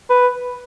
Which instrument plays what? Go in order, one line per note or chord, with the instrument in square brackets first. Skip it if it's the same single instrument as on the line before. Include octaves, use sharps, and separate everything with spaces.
[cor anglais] B4